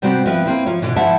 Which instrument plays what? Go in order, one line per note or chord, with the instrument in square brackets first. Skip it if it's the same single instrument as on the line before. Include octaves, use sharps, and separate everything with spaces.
[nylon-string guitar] C3 G3 B3 C4 F#4
F3 C4 B4 E5
A#3 C4 E4
F3 F4 C#5
B2 D3 E3
F3 E4 E5 F#5 A5